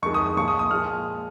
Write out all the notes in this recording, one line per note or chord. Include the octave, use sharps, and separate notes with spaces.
F2 D#3 G#3 C#6
D#6
D#6
A#2 F3 G#3 C#6
D#6
D#6
A#2 F3 G#3 F6